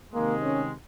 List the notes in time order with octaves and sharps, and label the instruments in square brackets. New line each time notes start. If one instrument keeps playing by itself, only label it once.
[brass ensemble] C3 D#3 G#3 [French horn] A#3
[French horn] C#4